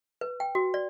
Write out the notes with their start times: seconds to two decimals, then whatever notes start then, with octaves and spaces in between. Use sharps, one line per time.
0.21 B4
0.40 G5
0.55 F#4
0.74 D5